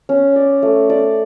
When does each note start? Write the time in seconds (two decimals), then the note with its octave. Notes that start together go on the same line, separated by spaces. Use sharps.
0.09 C#4
0.36 D5
0.63 A3
0.90 D5